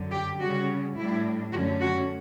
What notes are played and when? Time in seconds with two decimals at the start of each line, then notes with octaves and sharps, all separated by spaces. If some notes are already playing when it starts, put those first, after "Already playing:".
Already playing: F#2 D3 F#3
0.11 G4
0.40 C#3 G3 C#4 F#4
0.96 A2 G3 D4 E4
1.52 F#2 D3 A3 C#4 F#4
1.81 F#4